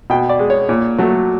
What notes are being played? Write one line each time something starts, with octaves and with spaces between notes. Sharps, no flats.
B2 G5
D5
G#3
C#5
A#2
F#3 A3